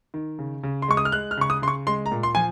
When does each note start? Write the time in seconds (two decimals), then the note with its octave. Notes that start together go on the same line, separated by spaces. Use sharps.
0.14 D#3
0.39 C#3
0.63 C#3
0.82 C6
0.88 G#3 C#6
0.97 D#6
1.05 F6
1.12 G#3 F#6
1.31 F6
1.37 C#3 C#6
1.50 D#6
1.62 C#3 C6
1.68 C#6
1.87 G#3 C6
2.06 A#5
2.12 A#2
2.23 C6
2.35 F3 G#5